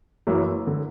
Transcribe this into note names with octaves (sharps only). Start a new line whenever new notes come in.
F#1 F#2 E3
D3